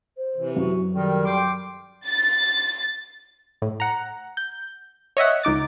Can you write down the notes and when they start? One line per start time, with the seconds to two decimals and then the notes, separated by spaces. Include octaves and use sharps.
0.17 C5
0.36 C3 E3
0.57 F#2 F#4
0.93 D#3 G3 A4
1.25 G5 C6 D6
2.06 A6
3.62 A2
3.80 F#5 A#5
4.37 G6
5.17 C#5 D#5 E5 F#5
5.43 C#2 D#4 D6 A6